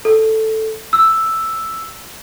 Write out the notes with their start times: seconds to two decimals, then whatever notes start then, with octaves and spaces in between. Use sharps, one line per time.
0.05 A4
0.93 E6